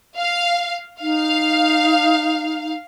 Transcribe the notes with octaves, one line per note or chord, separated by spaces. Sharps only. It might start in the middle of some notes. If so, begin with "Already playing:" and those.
F5
D#4 F5